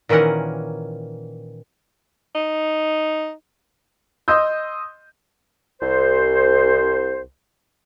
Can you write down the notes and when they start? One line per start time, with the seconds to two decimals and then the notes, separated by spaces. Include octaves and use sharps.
0.09 A#2 D#3 E3 C#4 A#4 F#5
2.35 D#4
4.28 D#5 C6 D#6 E6 G6
5.81 C2 C5